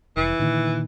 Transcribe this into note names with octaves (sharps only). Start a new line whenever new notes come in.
F1 E3
A#2 D3 D#3